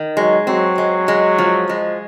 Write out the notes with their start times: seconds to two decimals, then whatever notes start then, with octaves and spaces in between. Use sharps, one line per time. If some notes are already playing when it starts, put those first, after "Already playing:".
Already playing: D#3
0.17 F#3 G#3
0.47 F#3 C4
0.78 G#3
1.08 G#3
1.38 F3
1.69 G#3